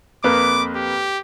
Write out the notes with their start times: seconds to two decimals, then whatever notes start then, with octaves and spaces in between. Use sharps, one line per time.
0.24 F2 A#3 B4 D6
0.75 G4